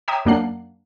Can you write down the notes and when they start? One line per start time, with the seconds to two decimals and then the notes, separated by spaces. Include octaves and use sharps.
0.08 C#5 E5 G5 A#5 D6 D#6
0.25 F#2 A#3 D4 F#5 C7